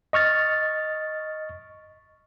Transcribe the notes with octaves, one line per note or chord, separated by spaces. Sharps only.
D#5 C#6 F6 A6